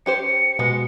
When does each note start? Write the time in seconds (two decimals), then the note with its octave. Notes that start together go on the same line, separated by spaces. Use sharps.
0.06 C#4 G4 C5 C#7
0.59 B2 G#3 B3